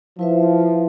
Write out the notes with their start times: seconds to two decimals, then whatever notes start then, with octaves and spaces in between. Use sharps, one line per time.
0.19 F3 E4 B4 E5